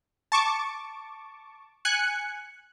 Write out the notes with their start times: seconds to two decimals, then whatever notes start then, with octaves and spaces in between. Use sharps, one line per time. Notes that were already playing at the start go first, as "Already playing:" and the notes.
0.32 A5 C#6 D6
1.85 G#5 F#6 C#7